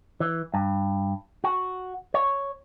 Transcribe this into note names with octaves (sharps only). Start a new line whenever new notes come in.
E3
G2
F#4
C#5